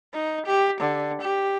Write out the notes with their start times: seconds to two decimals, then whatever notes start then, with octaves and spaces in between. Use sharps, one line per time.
0.14 D#4
0.46 G4
0.81 D3
1.21 G4